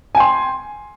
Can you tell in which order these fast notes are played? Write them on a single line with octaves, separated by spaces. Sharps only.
G#5 G5 C6